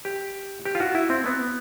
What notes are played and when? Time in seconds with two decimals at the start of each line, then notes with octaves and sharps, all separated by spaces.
0.05 G4
0.65 G4
0.75 F4
0.80 F#4
0.95 E4
1.10 C4
1.26 B3